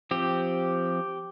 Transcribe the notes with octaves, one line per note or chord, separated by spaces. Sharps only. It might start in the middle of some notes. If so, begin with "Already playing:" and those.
F3 C4 G4